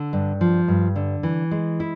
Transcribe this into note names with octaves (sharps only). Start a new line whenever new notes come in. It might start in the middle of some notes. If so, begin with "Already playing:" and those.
Already playing: D3
G2
F3
G2
D3
E3
G#3
E4